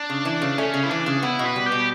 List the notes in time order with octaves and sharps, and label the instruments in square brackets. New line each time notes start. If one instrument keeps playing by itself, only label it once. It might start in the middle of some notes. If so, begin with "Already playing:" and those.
Already playing: [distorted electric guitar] D4
[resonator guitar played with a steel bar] C#3
E3
C#3
[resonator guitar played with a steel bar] A3 [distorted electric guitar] C#4
[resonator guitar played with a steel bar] C#3
[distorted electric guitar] E4
[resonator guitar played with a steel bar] E3 [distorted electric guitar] D4
[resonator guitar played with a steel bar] C#3
[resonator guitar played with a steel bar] B3 [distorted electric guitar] E4
[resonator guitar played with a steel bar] B2
[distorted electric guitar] B4
[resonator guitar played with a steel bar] G3
[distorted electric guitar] G4
[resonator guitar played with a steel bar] B2